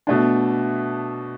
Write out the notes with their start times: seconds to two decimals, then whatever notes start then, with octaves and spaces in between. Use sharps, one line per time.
0.07 B2 A3 D4